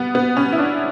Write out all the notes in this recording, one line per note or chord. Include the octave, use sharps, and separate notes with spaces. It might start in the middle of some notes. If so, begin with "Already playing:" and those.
Already playing: G3 B3
B3
C#4
E4
D4